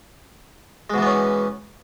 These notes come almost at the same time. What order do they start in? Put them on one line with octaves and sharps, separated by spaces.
G#3 B2 E3 B3 C#4